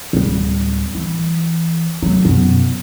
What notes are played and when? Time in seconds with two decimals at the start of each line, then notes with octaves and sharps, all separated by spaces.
0.13 D1 G3
0.95 E3
2.03 F#3 A3
2.25 F#2 B2